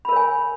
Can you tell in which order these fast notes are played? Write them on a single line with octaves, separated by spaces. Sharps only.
B5 A#4 C#5 G#5